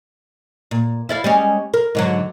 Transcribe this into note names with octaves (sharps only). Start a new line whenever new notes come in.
A#2
E4 D5 F5
G3 G#3 C#4
A#4
G#2 D3 F#3